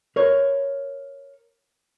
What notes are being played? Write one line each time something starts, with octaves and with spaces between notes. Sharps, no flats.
A#4 C#5